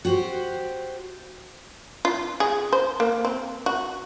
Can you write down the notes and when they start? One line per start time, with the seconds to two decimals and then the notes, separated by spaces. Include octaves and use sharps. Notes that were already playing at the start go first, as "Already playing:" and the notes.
0.05 F#4 G4 C5
2.05 F4
2.40 G#4
2.73 C5
3.00 A#3
3.25 C4
3.66 F#4